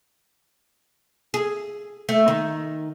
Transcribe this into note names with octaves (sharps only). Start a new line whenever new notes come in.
G#4
A3
D#3